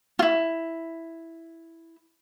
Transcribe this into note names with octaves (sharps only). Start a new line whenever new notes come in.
E4 F4